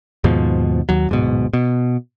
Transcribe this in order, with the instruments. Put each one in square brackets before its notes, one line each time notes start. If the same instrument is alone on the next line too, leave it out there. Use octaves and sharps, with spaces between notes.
[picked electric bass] D#2 G#2 B2 F3
D#2 F#3
D1 G#2 B2
B2